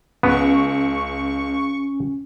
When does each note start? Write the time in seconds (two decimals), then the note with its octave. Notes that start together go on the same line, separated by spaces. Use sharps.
0.23 C#2 B3 C#4 C#6